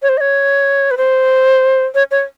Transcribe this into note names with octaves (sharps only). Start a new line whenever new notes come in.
C#5
C5
D#5
C#5
B4
C5
C#5
C#5